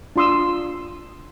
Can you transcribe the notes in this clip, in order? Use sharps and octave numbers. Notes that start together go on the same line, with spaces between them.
D4 F4 C6 D#6 E6